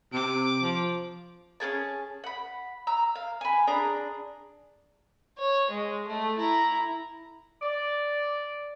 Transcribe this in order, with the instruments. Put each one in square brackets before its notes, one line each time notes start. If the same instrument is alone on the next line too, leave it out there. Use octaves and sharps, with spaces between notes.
[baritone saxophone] C3 [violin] D6
[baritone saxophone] F3
[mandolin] C#4 E4 G#4 A5
F#5 B5
A#5 E6
F5
B4 G#5
D4 G#4 A#5
[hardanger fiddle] C#5
G#3
A3
E4 A#5
[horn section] D5